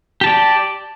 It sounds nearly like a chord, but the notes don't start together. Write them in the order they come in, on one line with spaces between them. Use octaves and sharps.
G4 A5 D5